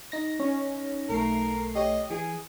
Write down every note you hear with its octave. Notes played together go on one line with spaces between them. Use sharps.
D#4 A#6
C#4
B1 A3 A#4 C7
G4 C#5 D#5
E3 G#4